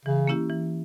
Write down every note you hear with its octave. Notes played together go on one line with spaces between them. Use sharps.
C#3 E3
A#3 C#4 E4 G4
E3